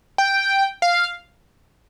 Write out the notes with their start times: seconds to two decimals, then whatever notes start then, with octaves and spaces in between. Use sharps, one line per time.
0.18 G5
0.82 F5